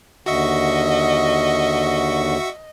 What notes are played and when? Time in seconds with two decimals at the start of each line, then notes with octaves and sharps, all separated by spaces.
0.26 D#2 D3 F#4 D#5 E5 C#6